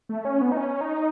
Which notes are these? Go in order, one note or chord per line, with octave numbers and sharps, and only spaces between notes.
A3
C#4
B3
D#4
C#4
D#4